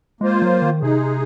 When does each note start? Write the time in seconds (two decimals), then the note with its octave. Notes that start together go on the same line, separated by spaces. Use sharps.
0.21 G#3 A#3 F4 C5
0.42 F#3
0.62 D#3
0.82 C3 G#3 D#4 G#4